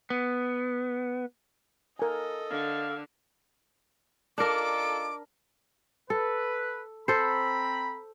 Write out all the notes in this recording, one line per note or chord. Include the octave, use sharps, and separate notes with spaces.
B3
A4 A#4 D#5 G#5
D3 F5
D4 D#4 F4 A4 A#4 D6
A4 B4
C4 A4 C5 A#5 B5